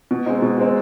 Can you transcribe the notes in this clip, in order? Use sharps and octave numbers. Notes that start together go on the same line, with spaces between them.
B2
G#3 C4 D#4
B2
G#3 C4 D#4